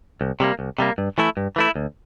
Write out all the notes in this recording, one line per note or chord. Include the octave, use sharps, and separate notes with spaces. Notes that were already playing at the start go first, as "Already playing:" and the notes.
C2
C3 G3 A#3
C2
C3 G3 A#3
G2
E3 A3 E4
G2
E3 A3 E4
D2